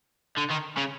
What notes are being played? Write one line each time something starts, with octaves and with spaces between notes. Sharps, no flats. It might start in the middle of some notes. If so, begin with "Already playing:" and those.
D3
D#3
C#3